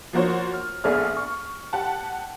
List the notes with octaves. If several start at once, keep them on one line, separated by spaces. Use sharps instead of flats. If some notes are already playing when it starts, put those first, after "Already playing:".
F3 A#3 F#4 C5 C#5
F6
A#1 B3 G#4 A4 D5 F6
C#6
G4 F#5 A5